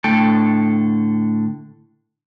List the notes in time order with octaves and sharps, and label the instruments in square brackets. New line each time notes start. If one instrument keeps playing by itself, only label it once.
[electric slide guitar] A2 D3 A3 A4 G5 A5